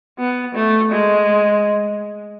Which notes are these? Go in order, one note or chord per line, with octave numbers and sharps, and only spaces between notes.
B3
A3
G#3